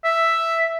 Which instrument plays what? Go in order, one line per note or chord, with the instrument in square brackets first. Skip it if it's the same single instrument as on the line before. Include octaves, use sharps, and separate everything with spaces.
[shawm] E5